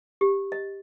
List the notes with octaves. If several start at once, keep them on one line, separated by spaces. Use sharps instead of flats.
G4
D#5